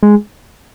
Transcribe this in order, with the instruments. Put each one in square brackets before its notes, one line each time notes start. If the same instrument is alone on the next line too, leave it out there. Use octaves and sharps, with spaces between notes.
[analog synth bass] G#3